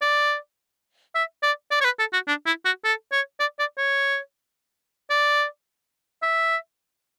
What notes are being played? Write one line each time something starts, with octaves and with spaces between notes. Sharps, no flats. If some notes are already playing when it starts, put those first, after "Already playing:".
D5
E5
D5
D5
C#5
B4
A4
F#4
D4
E4
F#4
A4
C#5
D5
D5
C#5
D5
E5